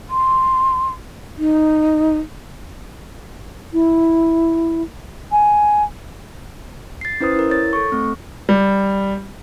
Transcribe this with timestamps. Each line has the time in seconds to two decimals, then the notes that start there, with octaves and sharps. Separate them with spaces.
0.10 C6
1.38 D#4
3.73 E4
5.32 G#5
7.01 A6 C7
7.20 C#4 E4 B4 C5 D#6
7.35 E4 A#4
7.50 C#5 A6
7.73 A4 C#6
7.92 A3 C4
8.49 G3